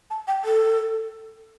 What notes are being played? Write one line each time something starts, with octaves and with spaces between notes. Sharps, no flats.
A5
G5
A4